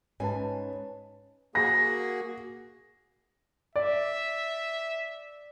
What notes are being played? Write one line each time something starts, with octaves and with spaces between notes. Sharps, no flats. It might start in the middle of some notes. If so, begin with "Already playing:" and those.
G#2 C#4 B4 G#5 A5
A#3 F#4 G#4 A#6
D5 E5